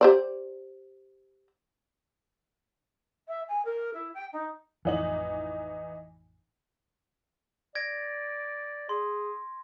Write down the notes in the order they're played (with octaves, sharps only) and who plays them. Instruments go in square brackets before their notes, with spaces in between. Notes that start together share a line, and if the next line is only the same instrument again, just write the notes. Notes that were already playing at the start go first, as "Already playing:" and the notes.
[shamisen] G4 C5 D5
[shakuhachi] E5
G#5
A#4
E4
G5
D#4
[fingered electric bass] A1 F2 [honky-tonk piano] E3 D#4 F#7
[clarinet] D5 [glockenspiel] G#6 A#6 D7
[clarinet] G#4 [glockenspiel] C6